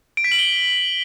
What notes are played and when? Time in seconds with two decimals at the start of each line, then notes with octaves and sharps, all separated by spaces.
0.17 D7
0.24 B6
0.32 F#7
0.39 G7